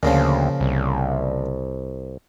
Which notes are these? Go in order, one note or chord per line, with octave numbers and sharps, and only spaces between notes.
D2 A#2 C#3 F3
C2